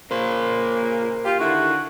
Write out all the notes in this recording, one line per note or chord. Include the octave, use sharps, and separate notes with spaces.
A#2 C#3 A#3 A#4 C5
F4 G4
D3 D#3 E4 F#4